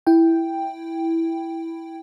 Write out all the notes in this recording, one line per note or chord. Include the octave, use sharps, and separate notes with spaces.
E4 G5